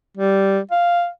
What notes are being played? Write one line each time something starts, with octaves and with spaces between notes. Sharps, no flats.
G3
F5